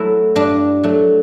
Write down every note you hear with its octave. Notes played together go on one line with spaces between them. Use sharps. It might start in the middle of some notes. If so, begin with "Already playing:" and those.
Already playing: F#3 A3 E4
G2 D4
F#3 A3